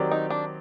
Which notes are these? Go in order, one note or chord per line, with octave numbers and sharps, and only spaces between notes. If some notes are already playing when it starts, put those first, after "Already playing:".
Already playing: D#3 F#3 C4 G4 D5
D#4
D4